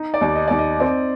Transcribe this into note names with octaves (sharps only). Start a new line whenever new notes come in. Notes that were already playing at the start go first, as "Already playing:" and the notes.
Already playing: D#4
D5
D#2
D#5
D#2 D5
D#5
C4 D5